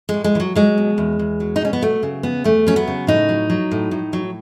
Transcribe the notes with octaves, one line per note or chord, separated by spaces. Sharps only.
G#3
A2
G#3
E3
F#3
F#3 G#3
B2
E2
E2
F#3
D#4
B2 C#4
B3
F#3 A3
C#3
E2 B3
E2 A3
F#3 C#4
B3
C#3
A2 D#4
F#3
F#3
A2
A2
F#3